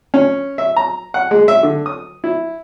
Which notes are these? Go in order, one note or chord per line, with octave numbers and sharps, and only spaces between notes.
C#4
E5
A#5
F#5
G#3
E5
D3
D#6
E4